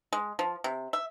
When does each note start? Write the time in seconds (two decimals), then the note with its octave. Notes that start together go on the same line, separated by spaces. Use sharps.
0.13 G#3
0.39 F3
0.64 C3
0.93 E5